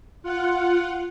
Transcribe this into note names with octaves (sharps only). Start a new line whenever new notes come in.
F4 F#5